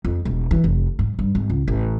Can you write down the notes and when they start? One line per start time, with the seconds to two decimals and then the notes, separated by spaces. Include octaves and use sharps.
0.05 F2
0.25 E1
0.51 E3
0.64 F1
0.99 G#2
1.19 G2
1.35 G#1
1.50 C#2
1.68 A1